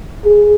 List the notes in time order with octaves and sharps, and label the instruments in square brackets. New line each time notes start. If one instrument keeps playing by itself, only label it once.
[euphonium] G#4